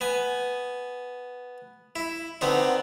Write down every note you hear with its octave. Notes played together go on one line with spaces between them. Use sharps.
B3 G#5
E4
D3 B3 C4 D#4